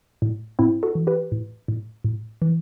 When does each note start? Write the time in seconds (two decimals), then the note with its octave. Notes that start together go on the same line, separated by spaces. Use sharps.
0.22 A2
0.59 A2 C4 E4
0.83 F#4 A4
0.95 E3
1.07 G4 B4
1.32 A2
1.68 A2
2.04 A2
2.42 E3